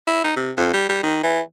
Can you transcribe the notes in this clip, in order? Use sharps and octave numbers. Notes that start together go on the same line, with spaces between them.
E4
D#4
C3
F2
G3
G3
D#3
E3